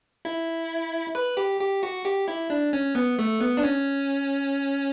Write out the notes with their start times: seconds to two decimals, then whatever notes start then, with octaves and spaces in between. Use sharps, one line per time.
0.25 E4
1.15 B4
1.37 G4
1.61 G4
1.83 F#4
2.05 G4
2.28 E4
2.50 D4
2.73 C#4
2.95 B3
3.19 A3
3.41 B3
3.57 D4
3.63 C#4